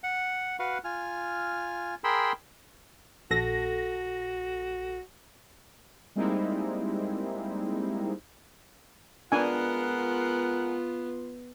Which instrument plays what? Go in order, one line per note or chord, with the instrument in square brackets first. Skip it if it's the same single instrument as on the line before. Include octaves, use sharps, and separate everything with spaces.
[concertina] F#5
F#4 B4 F5 F#5
F4 G#5 F6
G#4 A#4 G5 B5 C6 E6
[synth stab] A#1 A4 A#6 [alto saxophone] F#4
[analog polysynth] G3 G#3 A#3 C4 D#4 E4
[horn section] G#3 A#4 F#5 [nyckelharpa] B3 [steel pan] D4 G#5 [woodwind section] F4